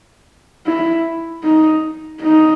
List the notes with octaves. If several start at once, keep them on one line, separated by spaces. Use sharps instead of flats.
E4
D#4
D#4